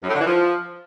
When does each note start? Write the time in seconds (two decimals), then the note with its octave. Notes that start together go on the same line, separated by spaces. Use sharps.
0.03 F#2
0.09 A2
0.14 D3
0.20 E3
0.26 F3